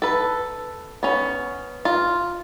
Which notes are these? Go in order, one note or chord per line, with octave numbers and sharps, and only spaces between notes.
A4 B4
B3 C#4
F4